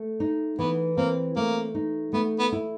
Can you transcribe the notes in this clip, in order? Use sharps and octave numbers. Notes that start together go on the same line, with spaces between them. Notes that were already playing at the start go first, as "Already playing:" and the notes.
Already playing: A3
D#4
E3 B3
A#3 C4
A3 A#3
D#4
A3 B3
B3
E4